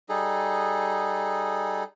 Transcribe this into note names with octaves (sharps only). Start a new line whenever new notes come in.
G3 D#4 G#4 A4